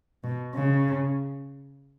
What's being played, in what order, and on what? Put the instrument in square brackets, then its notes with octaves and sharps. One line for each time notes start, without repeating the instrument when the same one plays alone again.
[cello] B2
C#3